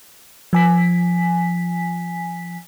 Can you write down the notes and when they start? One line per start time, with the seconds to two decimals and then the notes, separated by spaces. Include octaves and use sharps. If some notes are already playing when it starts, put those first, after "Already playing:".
0.53 F3 G#5 B6